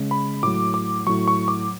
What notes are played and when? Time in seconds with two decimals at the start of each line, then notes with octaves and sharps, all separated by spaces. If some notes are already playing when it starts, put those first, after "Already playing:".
Already playing: C#3 G#3
0.11 B5
0.43 A2 F#3 D6
0.74 D6
1.06 A2 F#3 C#6
1.28 C#6
1.48 D6